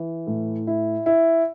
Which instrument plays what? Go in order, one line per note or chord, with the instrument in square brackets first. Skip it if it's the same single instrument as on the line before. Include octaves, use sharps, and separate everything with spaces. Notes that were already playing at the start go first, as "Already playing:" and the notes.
Already playing: [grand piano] E3
A2
E4
E4